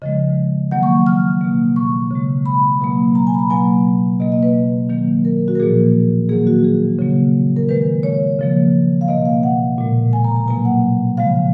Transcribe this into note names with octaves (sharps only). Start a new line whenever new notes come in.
C#3 F3 G#3 D#5
D#3 F#3 A#3 F#5
C#6
F6
B2 A#3
C#6
C#3
G#3
B5
B2 F#3 A#3
A#5
G#5
B5
A#5
B2 F#3 A#3 G#5
B2 A#3 D#5
D#5
B4
D#3 F#3 A#3
A#4
F#4
A#4
A#2 F3 A#3 G#4
D#3 F#3 A#3 G#4
F#4
G#4
C#3 F#3 A#3
A#4
D#3 G#3 B4
C#5
C#3 F3 A#3
F5
B2 A#3 D#5
F5
F#5
A#2 G#3
G#5
A#5
A#5
B2 F#3 A#3 G#5
F#5
C#3 F3 G#3 F5